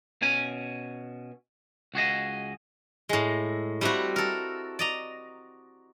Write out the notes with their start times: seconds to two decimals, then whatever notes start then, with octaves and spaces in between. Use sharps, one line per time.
0.22 B2 C#4 G#5
1.94 C#2 F#4 G#4 D#5
3.09 A2 G#3
3.81 G3 A3 C4 E4 F#4
4.16 A4 A#4
4.79 D5 D#5 A#5